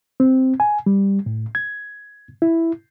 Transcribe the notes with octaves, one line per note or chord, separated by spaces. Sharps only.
C4
G#5
G3
A2
G#6
E4